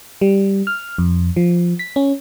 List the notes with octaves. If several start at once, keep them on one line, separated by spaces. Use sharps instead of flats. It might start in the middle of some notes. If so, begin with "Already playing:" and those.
G3
F6
F2
F3
B6
C#4